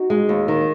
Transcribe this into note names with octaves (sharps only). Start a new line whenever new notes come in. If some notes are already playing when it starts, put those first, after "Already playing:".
Already playing: D#4 F#4
G#3
D#2
D#3